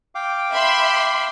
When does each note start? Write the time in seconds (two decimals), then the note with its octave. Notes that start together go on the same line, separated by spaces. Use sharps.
0.15 F5 G5 D6
0.52 E5 B5 C6